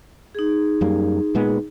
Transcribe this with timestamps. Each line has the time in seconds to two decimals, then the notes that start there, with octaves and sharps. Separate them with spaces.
0.35 D#4 G#4
0.81 F#2 G3 A#3
1.35 A#2 G#3 B3